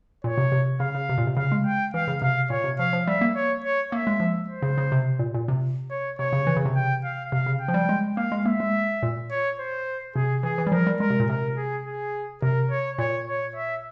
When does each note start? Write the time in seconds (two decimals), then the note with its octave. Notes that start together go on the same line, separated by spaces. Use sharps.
0.24 A#2 C#5
0.38 C3
0.52 C3
0.80 C#3 F5
0.95 C#3
1.10 C3
1.18 A#2
1.27 C3
1.37 C#3 F5
1.52 G#3
1.66 G5
1.94 E3 F5
2.08 C#3
2.22 C3 F5
2.50 A#2 C#5
2.64 C3
2.79 F3 F5
2.93 F3
3.07 G3 E5
3.21 A#3
3.36 C#5
3.64 C#5
3.92 A#3 E5
4.07 G#3
4.20 F3
4.48 C5
4.62 C#3
4.78 C#3
4.92 C3
5.19 A#2
5.35 A#2
5.48 C3
5.90 C#5
6.19 C3 C#5
6.33 C#3
6.47 E3
6.57 C#3
6.66 C3
6.76 G5
7.04 F5
7.32 C3 F5
7.46 C#3
7.60 G5
7.68 F3
7.74 G3
7.89 G#3
8.17 A#3 F5
8.32 G#3
8.45 A#3 E5
8.60 G#3
9.03 A#2
9.30 C#5
9.59 C5
10.15 C3 G#4
10.43 E3 G#4
10.58 E3
10.67 G3
10.72 F3 A#4
10.87 G3
11.00 G#3 A#4
11.10 C3
11.20 A#2
11.28 C3 A#4
11.57 G#4
11.86 G#4
12.42 C3 A#4
12.70 C#5
12.98 A#2 C#5
13.27 C#5
13.56 E5